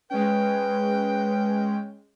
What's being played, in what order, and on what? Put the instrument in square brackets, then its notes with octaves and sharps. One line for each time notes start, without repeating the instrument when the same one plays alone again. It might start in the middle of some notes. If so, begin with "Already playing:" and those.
[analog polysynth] G#3 C#4 [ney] B4 [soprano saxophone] G5